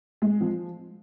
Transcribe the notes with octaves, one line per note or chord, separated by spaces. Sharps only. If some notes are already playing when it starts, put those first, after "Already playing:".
G#3
F3